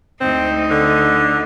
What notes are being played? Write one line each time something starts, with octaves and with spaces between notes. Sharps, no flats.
D2 C4 D#4
D3